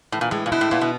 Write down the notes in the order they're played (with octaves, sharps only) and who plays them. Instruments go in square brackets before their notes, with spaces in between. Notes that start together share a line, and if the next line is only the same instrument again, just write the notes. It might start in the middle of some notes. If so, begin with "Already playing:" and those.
[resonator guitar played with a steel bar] A2 [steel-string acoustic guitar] E3
[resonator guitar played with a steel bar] A#2
[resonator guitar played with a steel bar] A2 [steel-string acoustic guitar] G#3
[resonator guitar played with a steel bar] A#2
[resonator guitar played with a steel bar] B2 [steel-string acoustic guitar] E4
[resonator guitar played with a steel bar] A2
[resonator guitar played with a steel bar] A#2 [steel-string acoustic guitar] B3
[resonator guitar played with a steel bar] B2